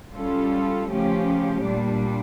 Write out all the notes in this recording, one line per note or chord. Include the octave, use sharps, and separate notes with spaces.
G3 C#4 F4 A4
C#3 F3 A3 C#4 G4
A#2 G3 D4